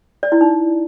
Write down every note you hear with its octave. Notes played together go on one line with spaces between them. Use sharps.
D5
E4
D#4